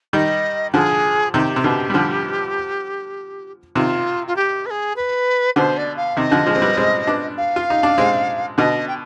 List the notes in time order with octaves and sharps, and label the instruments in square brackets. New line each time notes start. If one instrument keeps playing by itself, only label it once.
[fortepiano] D#3 G3 [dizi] D#5
[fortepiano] D3 F3 [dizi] G#4
[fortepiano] C3 D#3 [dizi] G4
[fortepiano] C3
B2 D3
G3
D3 F3
[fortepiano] C3 D#3 [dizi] F4
[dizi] F4
G4
B4
G#4
B4
[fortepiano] B2 D3 [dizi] C5
[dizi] D5
F5
[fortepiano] C3 D#3 [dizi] D#5
[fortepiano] D3 F3
F3 G#3
C4
G3 B3
G#3 C4
B3 D4
[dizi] F5
[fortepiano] F4
D#4
D4
G#3 C4
[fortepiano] B2 D3 [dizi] D#5
[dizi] G5